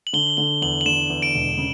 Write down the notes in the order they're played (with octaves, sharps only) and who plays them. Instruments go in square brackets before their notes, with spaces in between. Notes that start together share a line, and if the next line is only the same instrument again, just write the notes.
[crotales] F#7
[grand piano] D3 [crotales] G7
[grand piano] D3 [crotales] G7
[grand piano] E2 [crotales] F#7
[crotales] F#7
[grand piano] D3 [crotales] E7
[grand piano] E2
[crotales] D7
[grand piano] E1
C#3